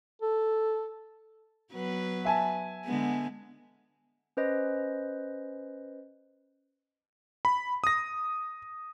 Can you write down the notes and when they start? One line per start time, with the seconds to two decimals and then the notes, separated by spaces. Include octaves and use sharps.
0.22 A4
1.72 F#3 B3 B4
2.25 E5 G#5 A5
2.85 D3 G#3 B3
4.37 C#4 B4 C5 D#5
7.45 B5
7.84 D#6 A#6